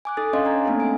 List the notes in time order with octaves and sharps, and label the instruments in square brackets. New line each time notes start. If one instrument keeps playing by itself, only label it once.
[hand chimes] G#5 D6 F#6
D#4 A4 D#6 A6
C#4 D4 C#5 D#5 F5 C6
G#5 A#5 G#6
A3 A#3 C4 D4 D#4 A4
G#5 D7